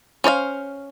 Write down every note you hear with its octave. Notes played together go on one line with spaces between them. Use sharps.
C#4 C5 D5 F5